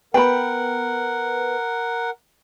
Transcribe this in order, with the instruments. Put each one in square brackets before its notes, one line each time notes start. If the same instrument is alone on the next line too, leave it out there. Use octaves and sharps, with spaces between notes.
[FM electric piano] B3 B4 [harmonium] A#4 F#5 [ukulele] G5 B5